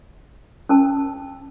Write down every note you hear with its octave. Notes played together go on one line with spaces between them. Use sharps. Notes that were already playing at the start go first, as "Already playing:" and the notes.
C#4 A#4 A5